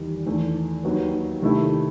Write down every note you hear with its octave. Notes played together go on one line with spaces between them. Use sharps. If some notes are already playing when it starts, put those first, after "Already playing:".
Already playing: E2 D#3 G3
E2 D#3 A3
D#2 D#3 F#3 B3
C3 D#3 A3 E4